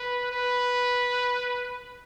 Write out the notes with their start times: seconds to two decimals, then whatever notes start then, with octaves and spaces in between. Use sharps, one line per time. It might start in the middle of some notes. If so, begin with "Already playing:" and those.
Already playing: B4
0.32 B4